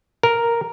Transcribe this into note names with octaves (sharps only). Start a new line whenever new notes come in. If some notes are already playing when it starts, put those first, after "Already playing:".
A#4